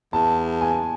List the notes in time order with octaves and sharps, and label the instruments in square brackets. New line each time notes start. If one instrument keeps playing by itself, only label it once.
[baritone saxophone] E2 [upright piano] A5
[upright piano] G#5